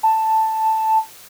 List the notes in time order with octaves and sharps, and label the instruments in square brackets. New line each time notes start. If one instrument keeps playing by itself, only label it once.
[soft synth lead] A5